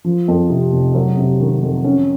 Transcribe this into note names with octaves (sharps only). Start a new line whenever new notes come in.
F3
F2
C3
F1
F#3
C3
D#3
F2
C#4